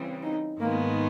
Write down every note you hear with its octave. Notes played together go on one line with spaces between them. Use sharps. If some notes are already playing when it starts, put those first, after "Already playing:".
Already playing: C#3 E3 G3 C4
D#4
G#2 D#3 G#3 A#3 B3